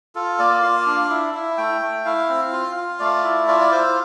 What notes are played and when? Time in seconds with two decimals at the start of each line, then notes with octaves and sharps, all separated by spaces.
0.15 F4 A4
0.39 A#3 D5
0.63 F4 F5
0.86 D4
1.10 E4
1.34 E4
1.58 A3 G5
1.82 A3
2.05 E4 F5
2.29 C4
2.53 F4
2.76 F4
3.00 A3 D5
3.24 E4
3.48 F4 D5
3.60 D5
3.71 F4 C5